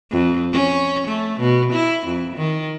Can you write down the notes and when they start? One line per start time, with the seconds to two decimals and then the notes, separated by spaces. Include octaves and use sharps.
0.11 F2
0.52 C#4
1.07 A3
1.40 B2
1.72 E4
2.07 F2
2.36 D#3